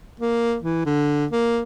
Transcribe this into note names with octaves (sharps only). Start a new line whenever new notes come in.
A#3
E3
D3
A#3